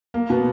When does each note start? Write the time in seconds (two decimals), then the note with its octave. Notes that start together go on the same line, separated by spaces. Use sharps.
0.14 A#3
0.30 B2 B3